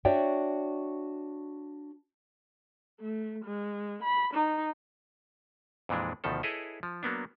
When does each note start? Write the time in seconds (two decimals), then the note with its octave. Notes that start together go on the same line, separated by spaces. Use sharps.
0.05 D4 F#4 C#5 D5 E5 G5
3.01 A3
3.45 G#3
4.03 B5
4.34 D#4
5.89 F2 A#2 E3 G#3 D4
6.24 D2 B2 D#3 F3 A4
6.43 E4 G#4 A4 B4 C#5 D#5
6.83 F3
7.03 F#3 A#3 B3 D4